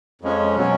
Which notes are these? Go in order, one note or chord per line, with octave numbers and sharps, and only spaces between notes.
F2 F3 G#3 C#4
B2 F#3 C#4